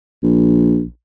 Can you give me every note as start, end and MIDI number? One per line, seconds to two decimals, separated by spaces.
0.23 0.84 34